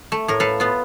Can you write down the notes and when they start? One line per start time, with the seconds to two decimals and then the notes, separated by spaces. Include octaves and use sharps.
0.12 A3
0.28 A2 A#4
0.40 A4 B4 F5
0.60 B3 F4